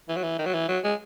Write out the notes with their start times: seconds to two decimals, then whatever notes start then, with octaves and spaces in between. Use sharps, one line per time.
0.09 E3
0.16 F#3
0.23 E3
0.39 D#3
0.46 F#3
0.54 E3
0.68 F#3
0.84 G#3